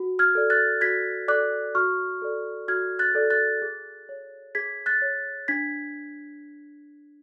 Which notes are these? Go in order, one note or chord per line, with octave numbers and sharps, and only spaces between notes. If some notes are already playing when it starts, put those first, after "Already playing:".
Already playing: F#4
F6 G#6
A4 D5
F#6 A6
F#4 G#6 B6
A4 D5 D6 F#6
F#4 C#6 F6
A4 D5
F#4 F6 G#6
F#6 A6
A4 D5
F#6 A6
G#4
C#5
G#4 G#6 B6
F#6 A6
C#5
D4 G#6 B6